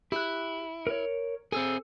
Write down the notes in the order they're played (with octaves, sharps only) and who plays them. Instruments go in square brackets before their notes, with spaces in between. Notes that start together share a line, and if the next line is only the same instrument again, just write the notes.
[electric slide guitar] E4 [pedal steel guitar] G4 F#6
[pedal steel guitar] A#4 C#5
[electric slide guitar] C4 G#4 [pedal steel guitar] A4 E6